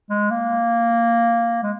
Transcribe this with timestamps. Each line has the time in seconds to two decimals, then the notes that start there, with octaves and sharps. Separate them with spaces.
0.10 G#3
0.31 A#3
1.63 G#3